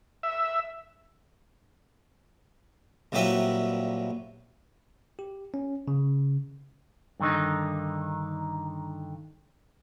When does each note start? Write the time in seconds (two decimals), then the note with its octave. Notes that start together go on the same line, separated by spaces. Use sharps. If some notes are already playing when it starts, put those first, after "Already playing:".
0.23 E5
3.12 C2 A#2 F#3 G4 B4 E5
5.19 G4
5.54 C#4
5.88 C#3
7.20 G2 D3 D#3 D#4